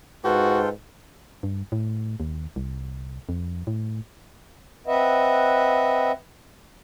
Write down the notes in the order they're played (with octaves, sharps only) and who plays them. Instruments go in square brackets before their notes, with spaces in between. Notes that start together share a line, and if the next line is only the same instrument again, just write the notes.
[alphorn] G#2 [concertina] F4 A4 G5 [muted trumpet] F#4 [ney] B4
[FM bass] G2
A2
D#2
C2
F2
A2
[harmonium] C4 B4 D#5 E5 F#5